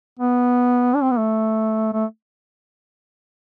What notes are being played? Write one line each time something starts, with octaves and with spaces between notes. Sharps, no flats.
B3
D4
C4
B3
A3
A3